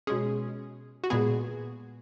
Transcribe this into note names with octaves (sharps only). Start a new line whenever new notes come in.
B2 G#3 C#4 G#4
F#4
A#2 G#3 B3 G#4